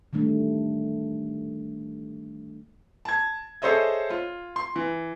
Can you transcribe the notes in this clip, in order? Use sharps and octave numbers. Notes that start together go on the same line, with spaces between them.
D#3 G3 A3 D4
A5 G#6
G#4 A4 C5 C#5 D#5 E5
F4
C6
E3